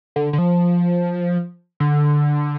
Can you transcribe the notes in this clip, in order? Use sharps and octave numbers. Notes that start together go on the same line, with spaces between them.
D3
D3
F3
D3